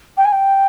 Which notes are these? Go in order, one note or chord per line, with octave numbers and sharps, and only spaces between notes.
G5
G#5
G5